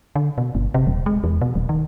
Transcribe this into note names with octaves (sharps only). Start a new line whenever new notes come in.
D3
B2
G1
C3
D#1
G#3
E2
B2
D#1
D#3